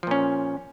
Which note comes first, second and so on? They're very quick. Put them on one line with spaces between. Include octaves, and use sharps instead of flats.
F3 A#2 C#4